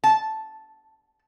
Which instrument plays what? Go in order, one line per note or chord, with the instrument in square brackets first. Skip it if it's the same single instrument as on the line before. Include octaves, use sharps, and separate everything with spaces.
[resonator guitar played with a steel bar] A5